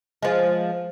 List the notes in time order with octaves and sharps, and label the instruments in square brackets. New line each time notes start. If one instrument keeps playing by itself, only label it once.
[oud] F3 G#3